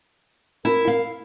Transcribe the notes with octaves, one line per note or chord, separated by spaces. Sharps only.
E4 A#4
F5